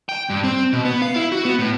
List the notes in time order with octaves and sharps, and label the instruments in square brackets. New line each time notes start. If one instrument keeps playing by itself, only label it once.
[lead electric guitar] G5
G2
C4
B2
B3
F5
E4
F#4
B3
A2